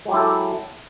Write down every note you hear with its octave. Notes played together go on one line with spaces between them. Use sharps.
F#3 G#3 E4 G4 A4